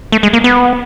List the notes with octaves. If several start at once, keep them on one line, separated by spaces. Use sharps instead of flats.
A3
G#3
A#3
B3